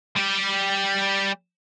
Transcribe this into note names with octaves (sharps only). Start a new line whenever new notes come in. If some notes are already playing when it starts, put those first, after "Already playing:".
G3 G4